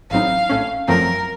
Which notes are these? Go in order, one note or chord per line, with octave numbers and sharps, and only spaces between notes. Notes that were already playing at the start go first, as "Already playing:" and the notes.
A1 A2 F#3 C4 D#4 F5
A1 A2 A3 C#4
F#2 F3 A3 C4 A#4